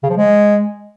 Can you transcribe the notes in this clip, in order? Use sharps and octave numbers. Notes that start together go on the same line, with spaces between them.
C#3
F3
G#3